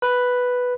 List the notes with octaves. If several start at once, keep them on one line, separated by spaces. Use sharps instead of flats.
B4